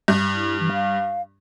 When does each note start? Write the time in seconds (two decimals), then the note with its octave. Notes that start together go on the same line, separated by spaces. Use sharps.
0.08 G2
0.34 E4
0.60 E3
0.72 F5